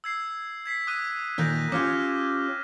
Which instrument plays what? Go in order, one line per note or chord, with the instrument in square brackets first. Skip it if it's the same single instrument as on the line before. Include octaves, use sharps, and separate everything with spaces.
[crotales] E6 G#6 C7
G#6 B6 C7
D#6 F#6 D#7
[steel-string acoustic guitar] A#2 D#3 A#4 [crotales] F#6 G6 A#6
[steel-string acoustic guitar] C#4 F4 G4 [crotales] D6 F6 G6